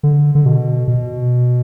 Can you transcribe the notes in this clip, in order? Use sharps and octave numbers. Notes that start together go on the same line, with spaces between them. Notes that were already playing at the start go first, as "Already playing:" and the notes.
D3
D3
B2
B2